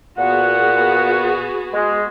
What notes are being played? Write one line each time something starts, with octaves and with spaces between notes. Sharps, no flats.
A#2 B3 F#4 G#4 F#5
G#3